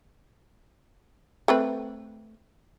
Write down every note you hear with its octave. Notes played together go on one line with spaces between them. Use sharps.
A3 C4 B4